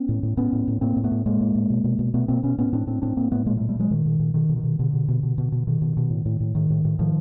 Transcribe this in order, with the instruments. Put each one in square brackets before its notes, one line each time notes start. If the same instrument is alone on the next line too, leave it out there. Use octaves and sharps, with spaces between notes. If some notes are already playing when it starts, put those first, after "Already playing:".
Already playing: [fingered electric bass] B3 C#4
A2
A2
A2 B3 C#4
A2
A2
A2 A#3 C4
A2
A3 B3
A2
A2 G#3 A#3
A2
A2
B2
B2
B2
B2 A3 B3
B2 A#3 C4
B2 B3 C#4
A2 B3 C#4
A2 C4 D4
A2 C4 D4
A2 C4 D4
A2 A#3 C4
A2 A3 B3
A#2 G#3 A#3
G3 A3
A#2
G3 A3
A#2 F#3 G#3
A#2 D#3
A#2
A#2
B2 D#3
B2
D#3
B2
B2 D3
B2
B2
B2
B2
B2
B2 D#3
B2
B2
A2
A2
A2
A2 D#3
A2
A2
A2 D#3 F3